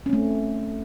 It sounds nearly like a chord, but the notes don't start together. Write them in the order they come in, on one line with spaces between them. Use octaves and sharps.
C#4 C4 A3